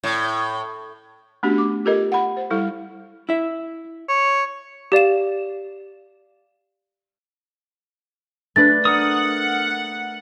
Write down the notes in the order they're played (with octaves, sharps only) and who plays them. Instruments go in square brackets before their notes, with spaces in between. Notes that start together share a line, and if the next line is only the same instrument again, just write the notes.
[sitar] A2
[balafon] A3 B3 C#4 D4 F#4 G4
D6
F4 G4 A4 A#4 D#5
F#5 B5
C5
G3 E4 A4
[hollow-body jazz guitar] E4 E5
[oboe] C#5
[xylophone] G4 D5 F5 E7
[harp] A3 D4 B4 [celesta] A6
[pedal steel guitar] A#4 D#6 [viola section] F#5